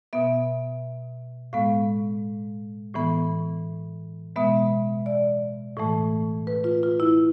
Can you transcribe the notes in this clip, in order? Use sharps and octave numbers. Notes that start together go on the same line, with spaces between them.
B2 B3 E5
A2 G#3 B3 F5
A2 E3 B3
B2 G#3 B3 E5
D5
A2 E3 A3
B4
F4
F4
E4